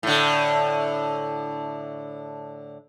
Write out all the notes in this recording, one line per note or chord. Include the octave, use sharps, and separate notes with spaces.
A2 D3